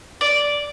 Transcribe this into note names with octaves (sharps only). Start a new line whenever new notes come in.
D5